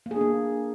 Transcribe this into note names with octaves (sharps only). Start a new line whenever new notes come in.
A#3
G#4
D4
A#3